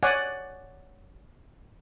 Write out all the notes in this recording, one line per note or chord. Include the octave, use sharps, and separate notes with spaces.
C#5 D5 F#5 G#5